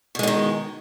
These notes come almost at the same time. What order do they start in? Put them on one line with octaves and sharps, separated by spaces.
B2 G#3 D3 D#3